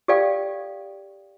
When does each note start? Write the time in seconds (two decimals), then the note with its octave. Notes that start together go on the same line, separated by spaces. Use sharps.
0.08 G4 A4 D5 F5 G5